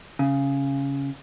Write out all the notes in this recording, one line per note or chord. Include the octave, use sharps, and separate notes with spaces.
C#3